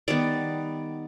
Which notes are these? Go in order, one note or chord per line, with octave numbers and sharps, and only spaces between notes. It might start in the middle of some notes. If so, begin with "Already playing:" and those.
D#3 G3 B3 D5